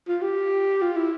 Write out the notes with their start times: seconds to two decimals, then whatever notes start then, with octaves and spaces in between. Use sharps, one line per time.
0.08 F4
0.22 G4
0.82 F4
0.96 E4